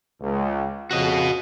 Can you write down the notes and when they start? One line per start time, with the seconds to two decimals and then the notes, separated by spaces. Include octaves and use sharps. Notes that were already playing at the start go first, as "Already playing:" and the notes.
0.21 C#2
0.91 F2 C#3 F#4 D#5